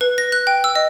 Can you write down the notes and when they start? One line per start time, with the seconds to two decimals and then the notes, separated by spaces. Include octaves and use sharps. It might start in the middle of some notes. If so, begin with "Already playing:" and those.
0.01 B4
0.18 A#6
0.32 F#6
0.47 G5
0.64 E6
0.75 D#5